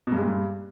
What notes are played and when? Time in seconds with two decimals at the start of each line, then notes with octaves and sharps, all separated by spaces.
0.07 B2
0.12 G2
0.17 G#3
0.22 A#2
0.27 G2